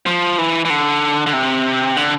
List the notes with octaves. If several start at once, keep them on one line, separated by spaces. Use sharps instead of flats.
F3
E3
E3
D3
D3
C3
D3